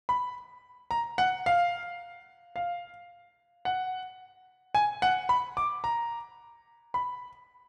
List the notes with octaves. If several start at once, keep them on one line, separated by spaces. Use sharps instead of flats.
B5
A#5
F#5
F5
F5
F#5
G#5
F#5
B5
D6
A#5
B5